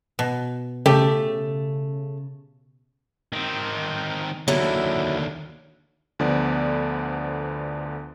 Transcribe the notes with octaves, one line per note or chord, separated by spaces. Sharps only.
B2
C#3 A3 G4
D#3 C4
D#2 D3 F#3 E4
D2 D3 F3 B3 D5